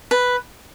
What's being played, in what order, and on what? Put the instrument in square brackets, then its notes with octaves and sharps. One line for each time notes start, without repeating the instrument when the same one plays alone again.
[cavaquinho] B4